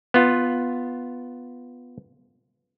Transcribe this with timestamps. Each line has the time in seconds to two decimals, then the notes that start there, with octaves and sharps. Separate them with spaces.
0.14 B3 F4